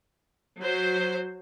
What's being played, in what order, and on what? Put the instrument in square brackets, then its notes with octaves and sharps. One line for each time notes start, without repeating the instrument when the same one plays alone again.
[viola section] F#3 C5